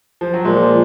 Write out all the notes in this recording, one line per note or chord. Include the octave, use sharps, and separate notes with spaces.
F3
F#3
A#2 F3 G#3
F3